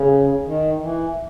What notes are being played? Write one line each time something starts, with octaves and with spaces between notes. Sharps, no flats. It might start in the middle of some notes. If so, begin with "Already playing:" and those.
Already playing: C#3
D#3
E3